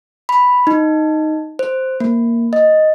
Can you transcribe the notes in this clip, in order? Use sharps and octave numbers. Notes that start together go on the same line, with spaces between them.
B5
D#4
C5
A#3
D#5